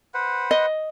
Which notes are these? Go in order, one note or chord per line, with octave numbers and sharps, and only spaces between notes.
B4 C5 F#5
D#5